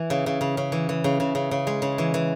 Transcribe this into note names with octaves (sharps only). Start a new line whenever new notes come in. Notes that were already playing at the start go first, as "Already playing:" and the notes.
Already playing: E3
C#3
C#3
C#3
C#3
E3
E3
C#3
C#3
C#3
C#3
G#3
C#3
E3
E3